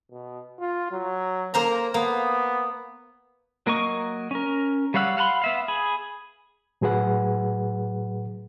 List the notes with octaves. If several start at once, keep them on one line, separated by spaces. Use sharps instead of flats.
B2
F4
F#3
A#3 A#4 C5 A#5
A#3 B3
F#3 A#3 A#4 D#5 C#6
C#4 A#4
G3 C#5 F5 F#5 E6
F5 F#5 A5 B5 C6
B3 E5 F5
G#4 B5
A2 F#3 G#4 B4 F#5